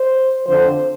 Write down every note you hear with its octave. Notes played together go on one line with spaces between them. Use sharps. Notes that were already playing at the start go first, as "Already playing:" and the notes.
Already playing: C5
F2 D3 F3 C5